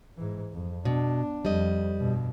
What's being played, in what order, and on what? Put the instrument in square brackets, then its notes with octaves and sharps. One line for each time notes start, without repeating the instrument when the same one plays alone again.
[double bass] G#2 E3
F2
[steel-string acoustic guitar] B2 [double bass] D4
[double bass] F2 [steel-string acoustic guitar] G3 D#5
[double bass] G2 B2